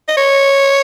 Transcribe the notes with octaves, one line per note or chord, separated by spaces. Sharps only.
D#5
C#5